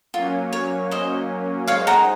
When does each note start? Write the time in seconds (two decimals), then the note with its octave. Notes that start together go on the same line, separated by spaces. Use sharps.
0.14 F#3 A#3 C#4 F4
0.53 C#5
0.91 C5 D#5
1.68 G#3 D#4 G#4 C5 C#5 F5
1.87 F#5 A#5